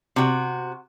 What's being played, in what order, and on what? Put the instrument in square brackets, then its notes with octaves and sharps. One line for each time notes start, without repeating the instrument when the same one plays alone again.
[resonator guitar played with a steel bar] C3 F#4